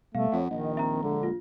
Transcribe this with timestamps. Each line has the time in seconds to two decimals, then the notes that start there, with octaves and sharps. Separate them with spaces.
0.15 B2 G3 A3 B3 F5
0.32 F2 C#5 F#5
0.51 A#1 D#3 D#5
0.77 C4 E5 A#5
1.03 D3 G#3 A#3
1.23 F4